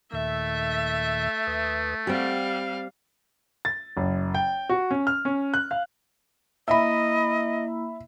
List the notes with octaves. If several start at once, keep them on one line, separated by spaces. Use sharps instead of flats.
D#2 A#2 D#3 A3 E5
D#2 B4 D#6
G3 C4 G4 F5 F#5
A6
F#1
G5
F#4
C#4
F6
C#4
F#6
F5
A#3 E4 D#5 E5 B5